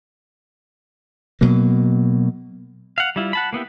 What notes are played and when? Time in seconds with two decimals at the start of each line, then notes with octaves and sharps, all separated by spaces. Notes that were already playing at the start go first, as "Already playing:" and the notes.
1.41 B2 F#3 A#3
2.98 F5 F#5
3.16 G3 E4 F4
3.33 F#5 A5 B5
3.53 A#3 B3 E4 G4